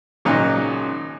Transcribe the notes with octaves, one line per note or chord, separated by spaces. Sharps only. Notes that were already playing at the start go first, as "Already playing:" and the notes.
G#1 A#2 C#3 F#3 D#4